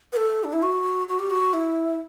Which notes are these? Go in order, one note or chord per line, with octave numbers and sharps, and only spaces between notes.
B4
A4
D4
E4
F#4
F#4
G4
F#4
E4